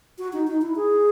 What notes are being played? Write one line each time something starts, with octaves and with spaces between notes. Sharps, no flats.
F#4
D#4
D#4
E4
G#4